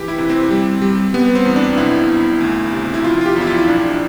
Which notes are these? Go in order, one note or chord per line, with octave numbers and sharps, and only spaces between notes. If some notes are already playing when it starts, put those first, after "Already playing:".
Already playing: E3 G4
E4
C3
C4
G3
G3
G3 B3
C4
E2
D4
B1 E4
B1
D2
C3
E4
F3 F4
F4
G4
E2 E4
F4
E4
B1 D4